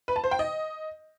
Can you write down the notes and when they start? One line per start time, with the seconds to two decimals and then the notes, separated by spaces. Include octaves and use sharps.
0.08 B4
0.16 A5
0.24 C5
0.31 G5
0.39 D#5